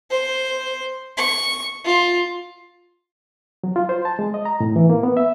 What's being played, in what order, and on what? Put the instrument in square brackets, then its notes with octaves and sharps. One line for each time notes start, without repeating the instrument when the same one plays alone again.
[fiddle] C5
C#6
F4
[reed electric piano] F#3
F4
C5
A5
G#3
D#5
A#5
A2
E3
A#3
B3
E5